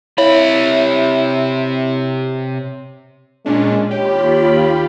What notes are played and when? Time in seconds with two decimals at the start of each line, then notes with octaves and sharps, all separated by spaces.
0.18 C3 E4 C#5 B5
3.46 A#2 G#3 C#4 D4
3.91 D#2 F4 G4 C#5 B5